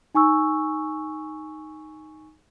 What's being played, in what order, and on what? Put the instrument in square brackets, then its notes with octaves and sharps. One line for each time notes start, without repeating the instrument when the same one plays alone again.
[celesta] D#4 G#5 C#6 E6